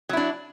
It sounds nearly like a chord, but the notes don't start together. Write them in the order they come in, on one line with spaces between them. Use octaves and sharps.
F#3 E4 D4